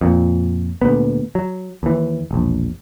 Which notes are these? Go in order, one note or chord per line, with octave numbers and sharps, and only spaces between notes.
F2 A#2
D2 A#2 B3
F#3
D#2 E3
E1 A#1